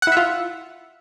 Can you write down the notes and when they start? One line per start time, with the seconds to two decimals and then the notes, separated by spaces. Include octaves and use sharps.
0.02 F#5
0.07 E4
0.12 E5
0.17 F4